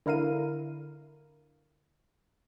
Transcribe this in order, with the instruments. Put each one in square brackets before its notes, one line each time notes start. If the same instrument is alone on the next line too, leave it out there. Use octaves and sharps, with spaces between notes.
[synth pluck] D3 E4 A#4 F5 D#7